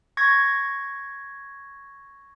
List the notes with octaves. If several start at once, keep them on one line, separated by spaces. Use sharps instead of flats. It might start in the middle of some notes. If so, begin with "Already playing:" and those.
C#6 G#6 A#6